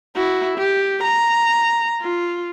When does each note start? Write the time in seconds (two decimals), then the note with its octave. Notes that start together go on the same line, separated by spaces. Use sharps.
0.15 E4 F#4
0.58 G4
1.03 A#5
2.01 F4